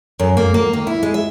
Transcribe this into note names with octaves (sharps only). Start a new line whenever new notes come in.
F#2
A#3
A#3
D#3
E4
G#3
E5